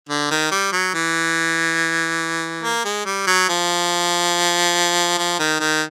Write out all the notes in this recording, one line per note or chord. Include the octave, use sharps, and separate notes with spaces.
D3
D#3
G3
F#3
E3
A#3
G#3
G3
F#3
F3
F3
D#3
D#3